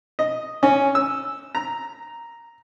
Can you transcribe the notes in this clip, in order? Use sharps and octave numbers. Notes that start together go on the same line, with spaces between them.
D#5
C#4
E6
A#5